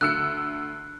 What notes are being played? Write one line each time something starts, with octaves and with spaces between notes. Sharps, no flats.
D2 E6 F#6 C#7